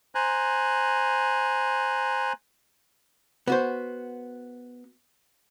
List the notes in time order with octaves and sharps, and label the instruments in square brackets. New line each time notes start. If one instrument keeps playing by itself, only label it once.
[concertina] C5 G#5 A#5 F#6
[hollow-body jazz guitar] B3 F#4 C5